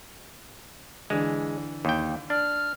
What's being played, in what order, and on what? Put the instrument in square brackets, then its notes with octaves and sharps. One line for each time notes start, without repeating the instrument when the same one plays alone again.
[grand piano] D3 E3 [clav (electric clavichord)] G#3
[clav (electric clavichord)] D#2 G5
[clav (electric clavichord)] D4 [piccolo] F6